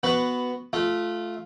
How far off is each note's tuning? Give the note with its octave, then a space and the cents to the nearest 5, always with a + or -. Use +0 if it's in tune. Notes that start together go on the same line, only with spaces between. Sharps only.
B3 +0 F#4 +0 B4 +10
A3 -15 F4 +0